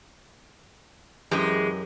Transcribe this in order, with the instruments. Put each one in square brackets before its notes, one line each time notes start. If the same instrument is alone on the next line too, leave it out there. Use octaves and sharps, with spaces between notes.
[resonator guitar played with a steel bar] F#2 G4 D#5 [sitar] E3 G#3